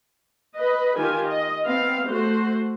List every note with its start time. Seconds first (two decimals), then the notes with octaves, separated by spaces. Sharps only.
0.57 B4 D#5
0.97 D#3 F4 G4 G#5
1.28 D#5
1.64 B3 C4 F5
2.09 A3 F#4 C5